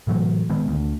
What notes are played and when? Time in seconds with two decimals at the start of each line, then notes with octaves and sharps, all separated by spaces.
0.07 A2 E3 F#3 A3
0.50 D#3 G#3 B3
0.68 D2